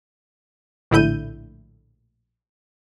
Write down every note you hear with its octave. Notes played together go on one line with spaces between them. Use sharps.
A#1 A2 D3 E4 G6 D#7